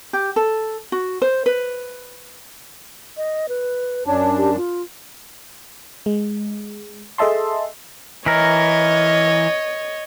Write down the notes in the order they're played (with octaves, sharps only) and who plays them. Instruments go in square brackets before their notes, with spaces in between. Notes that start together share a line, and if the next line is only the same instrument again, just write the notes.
[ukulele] G4
A4
F#4
C5
B4
[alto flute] D#5
B4
[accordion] F#2 D4 [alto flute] C#5
[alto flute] G4
F4
[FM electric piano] G#3
G#4 A4 D#5 E5 A5 C6
[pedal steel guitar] E3 A#4 [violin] C#5 D#5